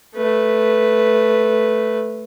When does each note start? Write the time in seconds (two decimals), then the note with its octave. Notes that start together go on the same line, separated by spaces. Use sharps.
0.15 A3 B4